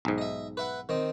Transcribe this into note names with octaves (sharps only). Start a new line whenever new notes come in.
B1 G#2
D#5 E5
B4 E5 F#5
D#3 C4 D#5